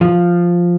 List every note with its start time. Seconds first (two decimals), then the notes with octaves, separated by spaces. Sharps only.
0.01 F3